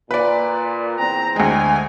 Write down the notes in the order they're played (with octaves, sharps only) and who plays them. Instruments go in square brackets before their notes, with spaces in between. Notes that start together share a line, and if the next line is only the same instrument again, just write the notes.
[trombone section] A#2 [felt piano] B4 D5
[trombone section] E2 C4 [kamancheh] A#5
[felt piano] D2 G#3 [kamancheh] G#5